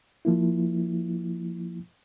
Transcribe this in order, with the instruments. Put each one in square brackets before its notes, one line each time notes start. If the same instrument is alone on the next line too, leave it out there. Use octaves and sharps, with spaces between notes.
[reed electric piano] F3 A#3 E4